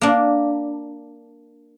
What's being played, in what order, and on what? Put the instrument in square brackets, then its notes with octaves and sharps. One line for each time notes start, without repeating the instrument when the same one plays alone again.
[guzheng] A#3 D4